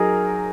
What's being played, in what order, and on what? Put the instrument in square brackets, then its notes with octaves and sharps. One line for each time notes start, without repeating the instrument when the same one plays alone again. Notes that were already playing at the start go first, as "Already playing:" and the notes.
Already playing: [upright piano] F#3 D#4 A#4 [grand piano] G#4